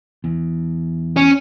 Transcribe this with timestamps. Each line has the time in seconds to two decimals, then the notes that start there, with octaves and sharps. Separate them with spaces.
0.24 E2
1.16 C#4